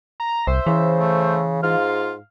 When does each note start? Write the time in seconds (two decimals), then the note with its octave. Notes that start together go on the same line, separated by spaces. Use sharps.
0.20 A#5
0.47 C2 C5 E5
0.67 C#3 E3
0.99 A3
1.63 G#2 F4 F5